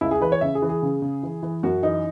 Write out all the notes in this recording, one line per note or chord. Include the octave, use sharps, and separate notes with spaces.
C#2 E4
G#4
E3 B4
C#5
C#3 E5
G#4
E3
G#4
C#3
C#3
E3
E3
F#2 F#4
E3 D#4